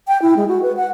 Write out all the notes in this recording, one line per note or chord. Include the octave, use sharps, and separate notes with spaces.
G5
E4
G#3
F#4
B4
F#5